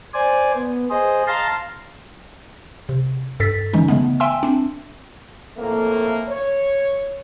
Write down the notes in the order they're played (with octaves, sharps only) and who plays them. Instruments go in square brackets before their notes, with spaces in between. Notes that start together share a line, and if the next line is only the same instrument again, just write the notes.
[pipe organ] C5 D5 G#5
B3
G#4 C5 D#5
F5 A5 A#5 C6
[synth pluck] C3
G2 A4 A6 B6
D3 E3 G#3 C#4 D#4
C#3 G#3 A3 B3
E5 G5 G#5 C6 E6
C4 D4
[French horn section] F2 A2 A3 A#3
C#5